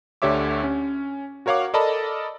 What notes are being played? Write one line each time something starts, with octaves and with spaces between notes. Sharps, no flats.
D2 D3 G4 C#5 E5 D6
C#4
F#4 A#4 C#5 F5 F#5 D6
A4 A#4 D5 D#5 A5 B5